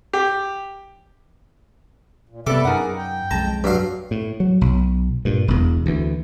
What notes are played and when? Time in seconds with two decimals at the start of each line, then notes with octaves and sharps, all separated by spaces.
0.13 G4
2.29 A#2
2.47 C3 G3 B3 A4 B4 D5 E5 D6
2.65 F#2 D#4 G#4 A#4 F#5
2.97 G5
3.31 B1 F2 G#3 A5 A#5
3.64 G2 F#3 G4 F5
4.11 A2
4.40 F#3
4.61 B1
5.25 G2 A#2
5.48 E1 E2
5.86 D2 E3